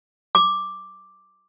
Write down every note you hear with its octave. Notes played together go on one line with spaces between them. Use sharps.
D6